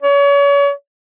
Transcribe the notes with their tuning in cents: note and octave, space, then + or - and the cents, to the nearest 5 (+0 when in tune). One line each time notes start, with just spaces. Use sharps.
C#5 +35